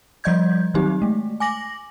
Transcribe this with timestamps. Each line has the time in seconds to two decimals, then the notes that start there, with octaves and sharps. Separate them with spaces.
0.24 F3 G3 D5 D#5 G6 G#6
0.74 D#3 F#3 C4 D#4 G4
1.02 G#3 A3
1.40 G#5 D6 A#6 F#7